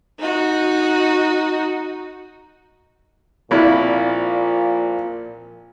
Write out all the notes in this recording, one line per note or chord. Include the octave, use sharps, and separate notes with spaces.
D#4 F#4
A#1 A#2 F3 C4 E4 D5